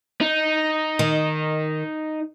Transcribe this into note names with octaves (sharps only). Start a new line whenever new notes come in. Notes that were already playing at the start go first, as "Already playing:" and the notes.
D#4
D#3